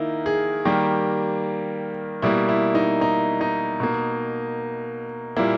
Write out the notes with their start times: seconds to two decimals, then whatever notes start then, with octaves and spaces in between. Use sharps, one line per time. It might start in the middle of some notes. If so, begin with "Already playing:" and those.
Already playing: D#3 A#3 D#4 E4
0.26 G#4
0.65 D#3 G3 A#3 G4
2.22 B2 G3 A#3 E4
2.49 E4
2.75 D#4
3.01 D#4
3.41 D#4
3.80 B2 A#3
5.37 A#2 G3 A#3 E4